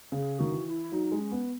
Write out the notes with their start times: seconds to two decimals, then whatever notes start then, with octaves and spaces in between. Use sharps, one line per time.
0.12 C#3 G#4
0.38 D#3 F#4
0.52 E3
0.65 F#4
0.68 E4
0.92 F#3 D#4
1.12 G#3
1.18 C#4
1.32 B3